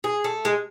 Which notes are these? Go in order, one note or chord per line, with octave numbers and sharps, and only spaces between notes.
G#4
A3
G#3